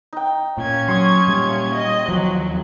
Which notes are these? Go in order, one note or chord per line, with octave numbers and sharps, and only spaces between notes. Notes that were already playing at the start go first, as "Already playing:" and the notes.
D#4 G5
A#2 C#4 G#6
F#3 C6 C#6 D#6
A#2 G3
D#5
D#2 F3 F#3